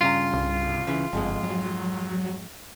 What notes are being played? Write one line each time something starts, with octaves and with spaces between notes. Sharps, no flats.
G2 C#3 F4 A#5
C2
C#3 E3
G1 F2 G#2 G#3
F#3